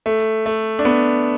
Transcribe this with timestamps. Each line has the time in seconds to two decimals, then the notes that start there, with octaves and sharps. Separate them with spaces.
0.06 A3
0.46 A3
0.79 D4
0.85 B3